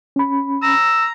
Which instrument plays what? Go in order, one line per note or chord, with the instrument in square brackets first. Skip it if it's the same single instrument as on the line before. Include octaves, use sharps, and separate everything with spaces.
[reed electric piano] C#4 B5
[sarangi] A#5 [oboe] E6